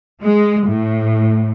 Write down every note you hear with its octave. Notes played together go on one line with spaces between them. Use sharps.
G#3
A2